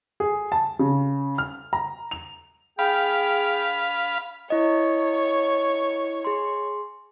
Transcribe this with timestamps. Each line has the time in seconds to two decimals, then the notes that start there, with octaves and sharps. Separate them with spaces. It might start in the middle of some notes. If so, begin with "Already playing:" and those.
0.20 G#4
0.52 A5
0.79 C#3
1.38 F6
1.73 A#5
2.11 F7
2.79 G#4 F5 G5 B5
4.50 E4 C#5 D#5
6.25 G#4 C6